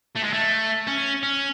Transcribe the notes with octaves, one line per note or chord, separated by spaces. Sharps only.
A3
G#3
A3
C#4
C#4